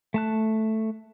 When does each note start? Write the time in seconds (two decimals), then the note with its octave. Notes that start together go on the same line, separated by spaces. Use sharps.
0.14 A3 A5 F#6